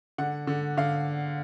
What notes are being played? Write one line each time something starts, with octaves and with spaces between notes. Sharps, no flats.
D3 F#5
D3
D3 F5